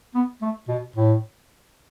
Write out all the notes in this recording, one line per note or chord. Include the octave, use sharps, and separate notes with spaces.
B3
A3
B2
A2